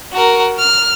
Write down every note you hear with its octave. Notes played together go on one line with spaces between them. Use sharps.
F#4 A#4
F6